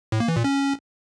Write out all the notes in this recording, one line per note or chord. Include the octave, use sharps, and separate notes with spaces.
A2
A#3
E3
A#2
C#4